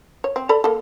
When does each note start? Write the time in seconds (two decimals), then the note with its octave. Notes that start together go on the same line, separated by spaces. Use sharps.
0.24 C#5
0.36 C4
0.49 A4 D5 B5
0.64 A#3 A4